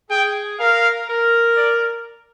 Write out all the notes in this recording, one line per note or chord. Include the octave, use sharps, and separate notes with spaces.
G#4 G5
A#4 F5
A#4
D5